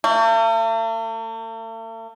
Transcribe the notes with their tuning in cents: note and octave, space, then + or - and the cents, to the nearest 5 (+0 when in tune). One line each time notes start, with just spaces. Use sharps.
A3 +45